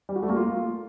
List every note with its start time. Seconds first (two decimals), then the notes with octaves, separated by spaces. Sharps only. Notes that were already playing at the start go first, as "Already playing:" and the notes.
0.09 G3
0.16 F#4
0.22 A3
0.29 A#3
0.36 F4